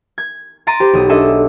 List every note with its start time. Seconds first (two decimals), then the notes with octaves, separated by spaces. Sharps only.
0.18 G#6
0.67 A#5 C6 A6 D7 D#7
0.80 G4 C5 B5
0.93 B1 D#6
1.09 D4 G#4 A4 B4 D#5 E5